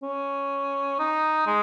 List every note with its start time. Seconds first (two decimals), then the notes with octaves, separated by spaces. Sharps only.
0.03 C#4
0.99 D#4
1.47 G#3